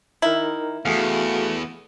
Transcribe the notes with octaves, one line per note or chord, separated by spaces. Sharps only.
D#4 E4 A#4
E2 A3 F#4 G#4 F5